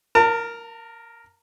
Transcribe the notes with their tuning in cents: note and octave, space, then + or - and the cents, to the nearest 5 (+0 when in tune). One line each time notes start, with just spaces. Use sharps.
A#4 +0 A5 +45